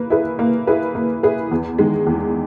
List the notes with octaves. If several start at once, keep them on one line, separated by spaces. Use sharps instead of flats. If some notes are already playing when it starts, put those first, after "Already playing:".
Already playing: A#3 B4
E4 G#4 B4
A#3
E4 G#4 B4
A#3
E4 G#4 B4
E2
D#3 G#3
E2